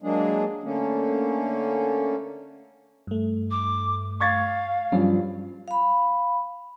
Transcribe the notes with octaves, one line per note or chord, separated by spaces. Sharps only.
F#3 G#3 A#3 D4 G#4
D3 A3 A#3 C#4
G2 A3
D6
F5 C#6 G#6 A6
G2 F3 F#3 C#4
F5 B5